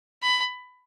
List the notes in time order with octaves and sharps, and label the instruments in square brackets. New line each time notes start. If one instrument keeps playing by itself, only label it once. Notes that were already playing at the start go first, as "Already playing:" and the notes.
[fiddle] B5